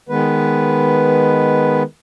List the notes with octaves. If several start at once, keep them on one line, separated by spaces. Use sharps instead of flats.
D#3 G#3 B3 B4